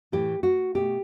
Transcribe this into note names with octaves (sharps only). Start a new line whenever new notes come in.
A2 E3 A3 G4
F#4
B2 A3 G4